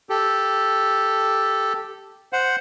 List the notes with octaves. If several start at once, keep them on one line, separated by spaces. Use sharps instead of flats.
G4 A4
C5 F#5